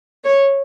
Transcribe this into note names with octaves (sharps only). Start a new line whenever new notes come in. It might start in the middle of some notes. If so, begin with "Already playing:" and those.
C#5